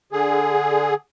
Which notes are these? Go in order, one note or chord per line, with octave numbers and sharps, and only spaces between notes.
D3 G#4